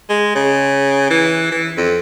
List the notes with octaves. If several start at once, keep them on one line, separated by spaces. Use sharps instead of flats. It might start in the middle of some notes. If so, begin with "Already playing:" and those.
G#3
C#3
E3
E3
F2